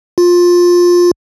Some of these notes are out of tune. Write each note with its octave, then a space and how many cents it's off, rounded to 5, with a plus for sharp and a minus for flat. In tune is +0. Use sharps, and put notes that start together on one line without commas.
F4 +15